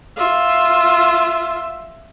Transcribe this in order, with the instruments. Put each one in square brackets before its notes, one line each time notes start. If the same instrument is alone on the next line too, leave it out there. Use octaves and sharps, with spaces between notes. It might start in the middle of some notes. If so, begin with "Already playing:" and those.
[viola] F4 E5